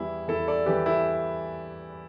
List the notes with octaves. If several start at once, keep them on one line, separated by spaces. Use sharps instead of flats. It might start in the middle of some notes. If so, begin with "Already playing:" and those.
Already playing: E2 E3 G3 E4
E2 E4 A4
A4 D5
E3 G3 G4 B4
E4 A4